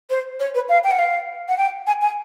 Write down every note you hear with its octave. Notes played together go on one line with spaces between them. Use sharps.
C5
C#5
B4
F5
G5
F#5
F5
F#5
G5
G#5
G#5